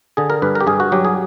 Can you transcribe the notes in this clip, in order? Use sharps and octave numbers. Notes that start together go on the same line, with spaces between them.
D3 G#4
A#4
G2 B4
A#4
G4
G2 G#4
F#4
F#3 G4
G#4